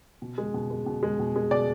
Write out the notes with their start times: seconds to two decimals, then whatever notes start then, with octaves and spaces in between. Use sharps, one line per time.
0.22 B2
0.38 G#3
0.54 B2
0.70 G#3
0.86 B2
1.03 G#3
1.19 B2
1.36 G#3
1.51 B2 D5